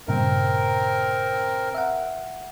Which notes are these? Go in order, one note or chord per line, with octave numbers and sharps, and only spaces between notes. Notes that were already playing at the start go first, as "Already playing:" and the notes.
G2 A#2 C#3 C4 A#4
E5 F#5